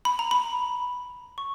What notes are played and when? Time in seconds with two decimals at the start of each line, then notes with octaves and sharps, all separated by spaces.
0.05 B5
0.19 A#5
0.31 B5
1.38 C#6